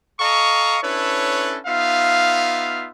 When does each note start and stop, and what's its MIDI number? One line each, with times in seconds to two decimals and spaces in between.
0.20 0.78 69
0.20 0.78 75
0.20 0.78 77
0.20 0.78 82
0.20 0.78 85
0.83 1.59 61
0.83 1.59 62
0.83 1.59 64
0.83 1.59 69
0.83 1.59 71
0.83 1.59 73
1.66 2.89 59
1.66 2.89 63
1.66 2.89 65
1.66 2.89 76
1.66 2.89 77